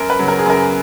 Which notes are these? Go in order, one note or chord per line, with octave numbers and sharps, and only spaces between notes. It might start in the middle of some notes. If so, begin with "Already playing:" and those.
Already playing: F#2 A#4
B4
C#3 F#3
A#4
G#4
F#2 A#4